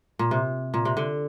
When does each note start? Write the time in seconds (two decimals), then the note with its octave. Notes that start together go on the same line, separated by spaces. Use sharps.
0.19 A#2
0.31 C3
0.74 A#2
0.85 C3
0.97 D3